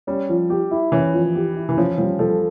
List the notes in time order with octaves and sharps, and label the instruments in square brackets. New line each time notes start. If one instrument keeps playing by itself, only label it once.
[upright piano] G3 [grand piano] C#4
[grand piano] F3
G4
E4
[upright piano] E3 [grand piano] C#4
[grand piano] F3
G4
E4
[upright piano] E3
[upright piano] F3 [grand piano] C#4
[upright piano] F3 [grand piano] G3
[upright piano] F3 [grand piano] A4